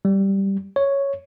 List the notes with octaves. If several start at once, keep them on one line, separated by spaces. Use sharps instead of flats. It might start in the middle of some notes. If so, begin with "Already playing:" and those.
G3
C#5